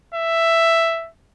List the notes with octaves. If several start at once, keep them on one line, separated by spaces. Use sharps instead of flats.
E5